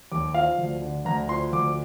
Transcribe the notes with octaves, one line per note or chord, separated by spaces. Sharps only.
D#2 D6
F3 F5
D2
D3
D2 A#5
F3 C6
D2 D6